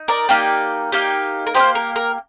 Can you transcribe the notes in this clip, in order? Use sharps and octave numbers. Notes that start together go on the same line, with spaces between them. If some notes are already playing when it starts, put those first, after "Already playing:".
Already playing: D#4
A#4 D5
A#3 D#4 G4
A#3 D#4 G4
A#4
A#3 D#4 G4 C5
A#4
A#4